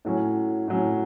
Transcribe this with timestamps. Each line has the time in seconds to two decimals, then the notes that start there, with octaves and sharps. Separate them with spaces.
0.05 A2 F#3 C#4
0.68 A2 F#3 C#4